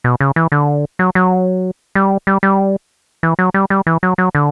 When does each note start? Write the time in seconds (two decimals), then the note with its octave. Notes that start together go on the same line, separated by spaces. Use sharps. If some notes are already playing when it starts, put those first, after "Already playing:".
0.04 B2
0.20 C#3
0.36 E3
0.52 D3
0.99 F#3
1.15 F#3
1.95 G3
2.27 G3
2.43 G3
3.23 E3
3.39 F#3
3.54 G3
3.70 G3
3.87 E3
4.03 F#3
4.18 F#3
4.35 D3